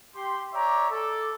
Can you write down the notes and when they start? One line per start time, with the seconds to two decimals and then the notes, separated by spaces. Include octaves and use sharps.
0.15 G4 C6
0.53 C#5 D5 E5 G5 A#5 D6
0.90 A4 D6